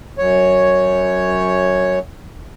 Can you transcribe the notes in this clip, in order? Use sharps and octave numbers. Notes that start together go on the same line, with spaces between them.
F#2 C#5